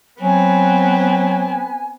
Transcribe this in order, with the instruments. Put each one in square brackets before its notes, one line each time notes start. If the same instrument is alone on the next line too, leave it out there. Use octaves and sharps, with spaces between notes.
[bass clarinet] F#3 [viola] B3 B4 [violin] C4 [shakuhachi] G#5